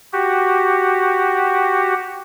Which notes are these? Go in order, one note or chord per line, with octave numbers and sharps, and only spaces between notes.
F#4 G4